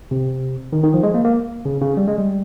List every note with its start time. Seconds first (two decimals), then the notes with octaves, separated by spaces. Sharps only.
0.11 C3
0.73 D#3
0.83 D#3
0.94 F3
1.03 G#3
1.14 A#3
1.25 A#3
1.65 C#3
1.82 C#3
1.97 G3
2.08 G#3
2.18 G3